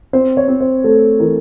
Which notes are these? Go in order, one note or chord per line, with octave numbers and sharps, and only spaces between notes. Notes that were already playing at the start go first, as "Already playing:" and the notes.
C4 C5
C#5
C4
C5
A3 A4
E3 A#4